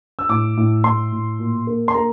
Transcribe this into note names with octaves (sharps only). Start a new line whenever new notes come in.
E6
A2 D6
A2
A2 C6
A2
A#2
A#3
C6
A#3 A#5